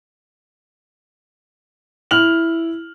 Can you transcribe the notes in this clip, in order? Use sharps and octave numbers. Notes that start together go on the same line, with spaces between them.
E4 F6 F7 F#7